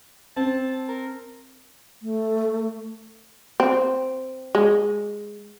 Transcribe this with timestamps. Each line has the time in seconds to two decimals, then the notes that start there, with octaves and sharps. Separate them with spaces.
0.36 C4 A5
0.88 A#4
2.02 A3
3.60 C4
4.55 G#3